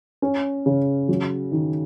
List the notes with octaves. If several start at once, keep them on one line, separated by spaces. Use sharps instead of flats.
C#4
C#3
F#3
D#3